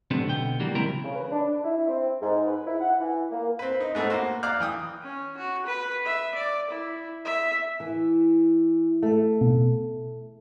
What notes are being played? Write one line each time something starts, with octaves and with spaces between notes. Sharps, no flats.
D3 F3 G3 A3 B3 C4
B1 D3 B3 G5
E3 F#3 G3 A#3
C#3 G#3 C4 E4 A#4 A#5
C#3
B4
D4
D4
E4
C4
G#2
B4
E4
F#5
E3
A#3
C4 B4
D#4
G#2 A3 B3 C4
A#3 F#4 C5
D5 F5 A#5 D6 F6 F#6
E3 G5 D#6
C#4
F#4
B4
E5
D5
E4
E5
E3
A3
B2